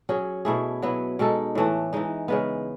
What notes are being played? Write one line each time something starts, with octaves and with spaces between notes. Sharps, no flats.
F#3 C#4 G#4
B2 A3 E4 G#4
F#3 B3 E4
B2 G#3 D#4 A4
A2 E3 A3
E3 G#3 D#4
C#3 G#3 B3